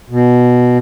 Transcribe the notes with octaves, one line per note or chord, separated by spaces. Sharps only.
B2